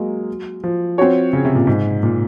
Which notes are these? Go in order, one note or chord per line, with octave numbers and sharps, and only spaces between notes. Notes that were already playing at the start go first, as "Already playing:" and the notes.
Already playing: F#3 G#3 A#3
F3
C4 F#4 C#5
C#3
C3
A#2
G#2
A#2